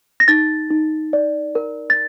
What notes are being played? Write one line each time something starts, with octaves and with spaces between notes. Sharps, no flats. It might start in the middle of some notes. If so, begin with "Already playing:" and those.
A#6
D#4 A6
D#4
D5
A#4
A6